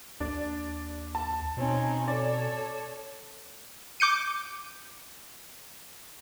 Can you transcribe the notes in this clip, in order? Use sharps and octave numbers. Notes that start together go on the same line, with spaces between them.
D#2 D4
A5
B2 C4 C#4 D#4
A4 C#5 D5
D6 G6 C#7 D#7